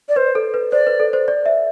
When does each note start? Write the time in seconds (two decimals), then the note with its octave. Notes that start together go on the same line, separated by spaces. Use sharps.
0.09 D5
0.16 B4 C5
0.35 A4
0.54 B4
0.72 C5 D5
0.87 B4
1.00 A4
1.13 C5
1.28 D5
1.46 E5